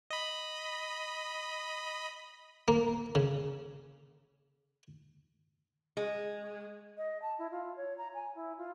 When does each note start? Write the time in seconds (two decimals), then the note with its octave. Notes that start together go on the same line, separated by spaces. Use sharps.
0.10 D#5 B5
2.68 A#3
3.15 C#3
5.97 G#3
6.97 D#5
7.21 A5
7.38 E4
7.51 F4
7.76 C#5
7.97 A#5
8.14 G#5
8.35 E4
8.57 F4